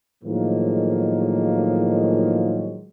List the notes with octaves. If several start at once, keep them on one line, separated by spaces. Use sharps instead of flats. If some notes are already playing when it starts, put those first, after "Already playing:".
A2 D#3 F3 F#3 G#3 A#3